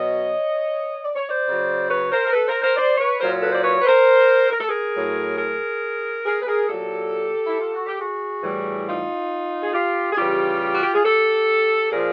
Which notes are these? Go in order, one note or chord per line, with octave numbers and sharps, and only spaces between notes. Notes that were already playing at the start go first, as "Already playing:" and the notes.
Already playing: B2 F#3 C#5 D#5
D5
C#5
C5 D5
C#3 F#3
B4 C#5
A#4 C5
A#4
A4 B4
A#4 C5
A#4 C5
C5 D5
B4 C#5
A#2 F#3 A#4 C5
A4 B4
C5 D5
B4 C#5
B4
A#4 C5
A#4
A4
G#4 A#4
A2 F#3
G#4 A#4
G#4 A#4
B4
G#4 A#4
A#2 F#3 G4 A4
E4
F4
F#4
G4
F#4 G#4
A2 E3 G3
D#4 F4
G#4
F4 G4
G#4
C#3 E3 G3 F4 G4
F#4
G4
G#4
G4 A4
A#2 F3 G#4 A#4